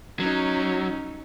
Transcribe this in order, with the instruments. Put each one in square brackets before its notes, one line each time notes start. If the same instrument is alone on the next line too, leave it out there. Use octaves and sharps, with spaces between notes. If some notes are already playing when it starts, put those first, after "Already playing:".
[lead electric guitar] F#3 [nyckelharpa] C#4 D#4